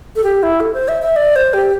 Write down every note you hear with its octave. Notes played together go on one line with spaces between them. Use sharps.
A4
G4
E4
A4
C5
E5
E5
D5
C5
G4